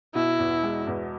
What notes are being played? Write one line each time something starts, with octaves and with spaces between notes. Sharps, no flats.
B2 E4
E2
G#3
E2